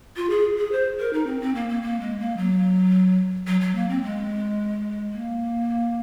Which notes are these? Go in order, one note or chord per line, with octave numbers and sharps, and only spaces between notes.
F4
G#4
G#4
C5
A#4
D#4
C4
C4
A#3
A#3
A#3
G#3
A#3
F#3
F#3
F#3
A#3
C4
G#3
A#3